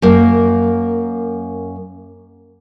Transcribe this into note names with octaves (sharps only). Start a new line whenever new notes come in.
F#2 A#3